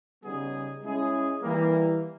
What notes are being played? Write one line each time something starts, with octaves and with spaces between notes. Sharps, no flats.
C#3 G3 B3 D#4 G#4
G#3 C#4 E4 G#4
E3 G3 A#3